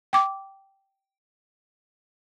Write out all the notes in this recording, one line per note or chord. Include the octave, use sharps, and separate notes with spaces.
G5 D6